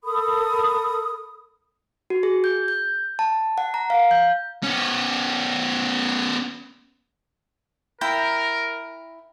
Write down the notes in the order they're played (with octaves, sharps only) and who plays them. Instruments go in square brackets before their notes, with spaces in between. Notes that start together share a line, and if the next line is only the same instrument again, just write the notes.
[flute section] A4 A#4 B5 D#6
[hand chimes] F#4
G#4
G6
G6
A5
F#5
A#5
F5
G6
[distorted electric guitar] B3 C#4
[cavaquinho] E4 G5 A#5 [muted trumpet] A#4